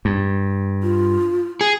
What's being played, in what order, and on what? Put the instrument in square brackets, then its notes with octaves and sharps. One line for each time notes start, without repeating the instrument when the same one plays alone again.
[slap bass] G2
[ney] F4
[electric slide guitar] G#4